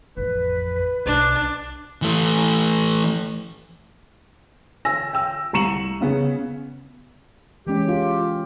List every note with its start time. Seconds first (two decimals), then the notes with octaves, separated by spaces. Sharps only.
0.17 A1 F2 B4
1.06 B1 D4
2.02 E3 A3
4.85 G#5 E6 A#6
5.13 G5 E6
5.53 C2 A#5 C#6 C#7 E7 F#7
6.01 C#3 B3 C#4
7.67 E3 G#3 C#4 G4
7.89 F4